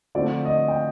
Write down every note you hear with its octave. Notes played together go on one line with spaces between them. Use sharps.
D3 F3 A3 C4 D5
D#5
G5